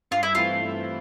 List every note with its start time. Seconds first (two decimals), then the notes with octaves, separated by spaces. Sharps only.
0.11 G2 F4
0.23 E4
0.35 E3 A3 C4 E4 F4
0.63 G2